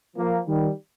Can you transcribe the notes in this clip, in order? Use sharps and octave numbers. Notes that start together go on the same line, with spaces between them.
F3 A#3
D#3 G3